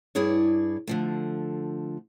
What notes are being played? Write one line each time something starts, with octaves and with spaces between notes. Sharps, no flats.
G2 E4 G#4 C#5 D5
D3 F3 A3